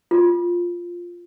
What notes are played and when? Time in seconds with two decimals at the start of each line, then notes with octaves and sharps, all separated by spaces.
0.11 F4